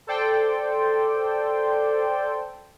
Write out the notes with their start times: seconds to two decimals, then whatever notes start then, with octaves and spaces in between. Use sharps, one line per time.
0.07 A4 C5 D5 G5